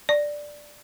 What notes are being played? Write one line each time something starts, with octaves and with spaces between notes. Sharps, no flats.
D5